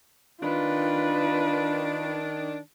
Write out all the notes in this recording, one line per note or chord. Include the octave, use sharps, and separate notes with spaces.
D#3 D4 F4 B4